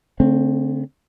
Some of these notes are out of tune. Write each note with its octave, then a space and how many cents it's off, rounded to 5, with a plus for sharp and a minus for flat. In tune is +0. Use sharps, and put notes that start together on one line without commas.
D3 -45 A3 +15 C4 +0